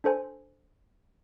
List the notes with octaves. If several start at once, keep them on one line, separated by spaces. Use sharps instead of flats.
D4 A4 C5 G#5